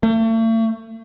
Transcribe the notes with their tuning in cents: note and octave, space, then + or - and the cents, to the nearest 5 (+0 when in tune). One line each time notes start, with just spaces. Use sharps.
A3 +40